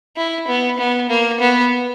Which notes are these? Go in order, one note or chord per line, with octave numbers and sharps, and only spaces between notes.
E4
B3
B3
A#3
B3